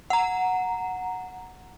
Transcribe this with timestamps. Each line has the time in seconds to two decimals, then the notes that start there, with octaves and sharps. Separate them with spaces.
0.10 F#5 A#5